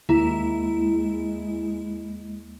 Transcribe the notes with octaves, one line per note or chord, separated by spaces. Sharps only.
D#2 G#3 A#3 E4 A#5